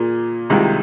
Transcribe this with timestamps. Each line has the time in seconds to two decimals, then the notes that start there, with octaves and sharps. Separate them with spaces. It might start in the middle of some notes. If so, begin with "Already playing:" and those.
Already playing: A#2 A#3 G#4
0.50 C2 C3 D#3 G#3 F4